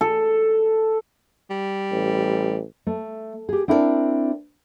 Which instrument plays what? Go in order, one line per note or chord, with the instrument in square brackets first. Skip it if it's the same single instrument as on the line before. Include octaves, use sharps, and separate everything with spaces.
[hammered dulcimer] A4
[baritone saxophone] G3
[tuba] A1
[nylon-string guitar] A3
G4 G#4
C4 D4 E4 A#4 C5 D5